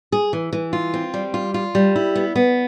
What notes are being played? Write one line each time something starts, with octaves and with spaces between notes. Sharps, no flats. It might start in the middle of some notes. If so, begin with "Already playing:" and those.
G#4
E3
E3
F4
C4
G3
F4
F4
G3
E4
B3
B3